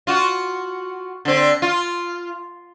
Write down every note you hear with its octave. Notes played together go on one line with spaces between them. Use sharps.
F4 F#4
D3 C4
F4